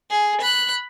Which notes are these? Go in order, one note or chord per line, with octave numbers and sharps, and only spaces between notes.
G#4
B5 F#6